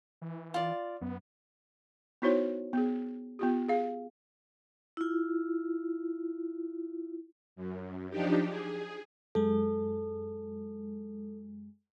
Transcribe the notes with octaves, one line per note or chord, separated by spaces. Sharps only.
E3
F4 D5
F#2 B3
B3 D#4 E4 F#4 C5 C#5
B3 G#4
B3 F4 G4
G#4 F5
E4 F4
F#2
F3 D4 D#4 G4
G#4
F#2 G#3 A4